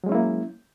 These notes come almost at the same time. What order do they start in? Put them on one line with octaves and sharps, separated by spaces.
F#3 G#3 C#4 E4 A#3